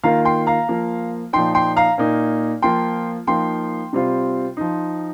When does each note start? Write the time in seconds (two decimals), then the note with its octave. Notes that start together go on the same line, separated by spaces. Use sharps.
0.04 D#3 A#3 F4 F5 A#5
0.25 G5 C6
0.47 F5 A#5
0.69 F3 A#3 F4
1.33 A#2 F3 D#4 G5 C6
1.55 G5 C6
1.76 F5 A#5
1.98 A#2 A#3 D#4
2.62 F3 A#3 F4 G5 C6
3.27 F3 A#3 D#4 G5 C6
3.93 C3 G3 C4 F4
4.57 F3 D#4